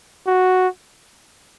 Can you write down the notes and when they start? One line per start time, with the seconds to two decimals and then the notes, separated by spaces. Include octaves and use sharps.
0.27 F#4